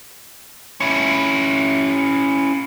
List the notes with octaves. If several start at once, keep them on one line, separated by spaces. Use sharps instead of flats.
C#4 E4